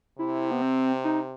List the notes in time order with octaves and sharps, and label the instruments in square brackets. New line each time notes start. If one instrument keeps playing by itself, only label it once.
[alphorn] C3 [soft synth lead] E4
[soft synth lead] B3
C4
D#4